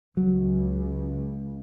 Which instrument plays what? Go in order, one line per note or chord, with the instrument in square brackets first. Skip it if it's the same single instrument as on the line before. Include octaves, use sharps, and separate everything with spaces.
[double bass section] C#2 [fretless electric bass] F#3